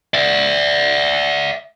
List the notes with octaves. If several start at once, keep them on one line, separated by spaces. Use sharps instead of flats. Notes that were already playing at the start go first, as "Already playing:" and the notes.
D5 E5